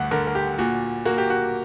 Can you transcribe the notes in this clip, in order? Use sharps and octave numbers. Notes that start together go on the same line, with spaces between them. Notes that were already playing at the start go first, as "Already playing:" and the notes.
Already playing: D2 G2 F#5
D3 A#4
A#4
G4
A#2 F#4
A#3 F#4
G4
F#4